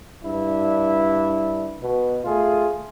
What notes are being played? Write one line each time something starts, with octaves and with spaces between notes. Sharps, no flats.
G2 D4 E4
B2
A3 F4 G#4